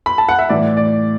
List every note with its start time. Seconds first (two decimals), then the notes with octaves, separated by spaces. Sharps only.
0.06 B5
0.18 A5
0.29 F#5
0.39 E5
0.49 A2 E3 D5
0.77 D5